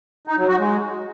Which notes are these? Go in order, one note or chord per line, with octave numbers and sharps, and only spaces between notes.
D#4
F#3
F#4
G#3